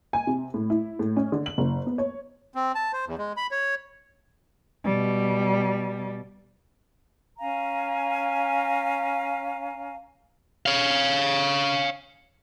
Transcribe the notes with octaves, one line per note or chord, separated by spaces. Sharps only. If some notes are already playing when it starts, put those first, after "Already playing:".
G#5
C3
A2
E4
A2
C#4
D3
F#7
F#1
B3
C#5
C4
A5
C5
E2
G#3
B5
C#5
B2 G3
C#4 F5 G#5 A#5
C#5 F5